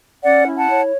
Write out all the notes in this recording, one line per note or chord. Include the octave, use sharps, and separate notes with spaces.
C#4 D5 F#5
E4
F#5 A5
C#5